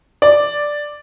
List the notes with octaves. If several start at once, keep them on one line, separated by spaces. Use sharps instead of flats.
D5